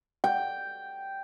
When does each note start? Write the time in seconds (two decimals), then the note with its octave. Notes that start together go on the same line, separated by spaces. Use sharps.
0.24 G5